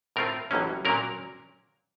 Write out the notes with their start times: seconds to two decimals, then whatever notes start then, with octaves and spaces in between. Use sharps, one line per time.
0.16 A2 A3 C4 F4 A#4
0.51 A1 A2 F#3 A#3 C#4
0.85 A#2 F#3 A#3 C#4 A#4